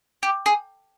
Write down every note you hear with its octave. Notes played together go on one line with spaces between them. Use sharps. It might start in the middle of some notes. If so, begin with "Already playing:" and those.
G4
G#4